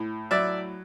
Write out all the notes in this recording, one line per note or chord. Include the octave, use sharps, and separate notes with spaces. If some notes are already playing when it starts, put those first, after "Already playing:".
Already playing: A2
F#3 D5 E5